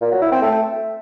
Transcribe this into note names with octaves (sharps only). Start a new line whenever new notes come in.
A#2
F#3
E4
C4
A3